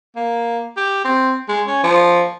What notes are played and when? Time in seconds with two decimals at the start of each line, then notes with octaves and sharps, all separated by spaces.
0.16 A#3
0.77 G4
1.05 C4
1.48 G#3
1.67 C#4
1.84 F3